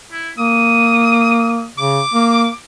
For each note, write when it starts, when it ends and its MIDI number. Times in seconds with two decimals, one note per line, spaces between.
0.12 0.30 64
0.38 1.67 58
0.38 1.70 87
1.78 2.00 49
1.78 2.56 86
2.14 2.48 58